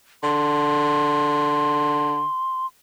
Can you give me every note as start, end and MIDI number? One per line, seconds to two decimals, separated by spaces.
0.23 2.25 50
0.23 2.66 84